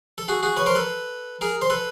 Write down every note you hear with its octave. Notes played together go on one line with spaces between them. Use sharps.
A4
F#4 G#4
F#4 G#4
B4 C#5
A#4 C5
A4 B4
G#4 A#4
C5
A4 B4